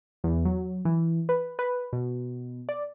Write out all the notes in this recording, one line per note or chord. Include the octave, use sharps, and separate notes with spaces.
E2
F#3
E3
B4
B4
B2
D5